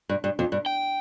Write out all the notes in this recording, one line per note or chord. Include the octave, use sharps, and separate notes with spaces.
G2
G2
F2
G2
G5